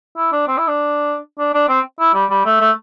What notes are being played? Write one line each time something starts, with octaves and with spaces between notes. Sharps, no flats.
E4
D4
C4
E4
D4
D4
D4
C4
E4
G3
G3
A3
A3